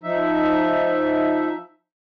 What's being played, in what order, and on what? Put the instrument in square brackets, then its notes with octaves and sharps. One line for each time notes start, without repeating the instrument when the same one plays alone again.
[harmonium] F3 D#4 E5